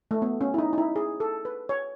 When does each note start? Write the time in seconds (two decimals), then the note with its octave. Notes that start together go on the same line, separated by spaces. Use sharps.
0.11 A3
0.22 B3
0.41 C#4
0.54 E4
0.58 D#4
0.73 D#4
0.78 E4
0.96 G#4
1.20 A4
1.45 B4
1.69 C#5